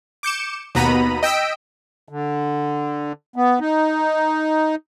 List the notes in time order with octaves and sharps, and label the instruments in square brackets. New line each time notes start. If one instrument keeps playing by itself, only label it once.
[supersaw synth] D6 G6 C#7 E7
D#2 B2 B3 A#5 B5 D#7
D#5 G5 E6 B6 D7
[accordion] D3
B3
D#4